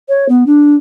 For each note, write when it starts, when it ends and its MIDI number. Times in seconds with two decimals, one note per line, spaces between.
0.08 0.26 73
0.28 0.46 59
0.46 0.74 62